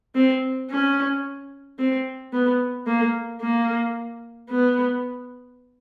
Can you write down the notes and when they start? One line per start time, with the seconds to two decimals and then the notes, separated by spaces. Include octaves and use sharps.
0.15 C4
0.70 C#4
1.79 C4
2.33 B3
2.87 A#3
3.41 A#3
4.50 B3